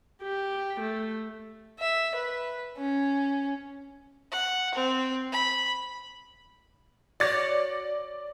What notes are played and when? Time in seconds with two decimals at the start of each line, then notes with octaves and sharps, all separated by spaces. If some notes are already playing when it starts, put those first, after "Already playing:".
0.23 G4
0.80 A3
1.79 E5
2.15 B4
2.77 C#4
4.32 F#5
4.75 C4
5.33 B5
7.20 F#4 C#5 D5 A6 A#6